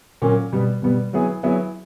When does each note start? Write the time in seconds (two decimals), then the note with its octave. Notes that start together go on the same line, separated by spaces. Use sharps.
0.22 A#2 F#3 A#3 C#4
0.52 B2 G3 B3
0.82 B2 G3 B3
1.13 F#3 B3 E4 G#4
1.43 F#3 B3 E4 G#4